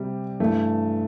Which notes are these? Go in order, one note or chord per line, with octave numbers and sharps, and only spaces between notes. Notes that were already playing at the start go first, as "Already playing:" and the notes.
Already playing: C3 G3
G2 E3 A3